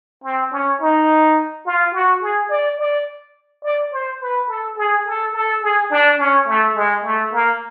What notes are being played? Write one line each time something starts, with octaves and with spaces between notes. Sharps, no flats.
C4
C#4
D#4
F4
F#4
G#4
D5
D5
D5
C5
B4
A4
G#4
A4
A4
G#4
D4
C#4
A3
G#3
A3
A#3